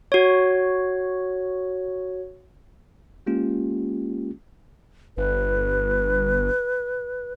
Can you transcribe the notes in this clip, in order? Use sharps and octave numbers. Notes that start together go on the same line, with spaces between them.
F#4 C#5
G#3 A#3 C#4 F4 G4
G1 B4